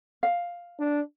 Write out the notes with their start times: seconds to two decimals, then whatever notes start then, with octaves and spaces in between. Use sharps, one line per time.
0.23 F5
0.79 D4